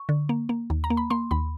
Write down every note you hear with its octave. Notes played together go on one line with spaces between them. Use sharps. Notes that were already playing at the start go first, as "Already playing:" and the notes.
Already playing: C#6
D3
A#3
A#3
D#2
A#5
A#3
B5
A#3 C6
D#2 B5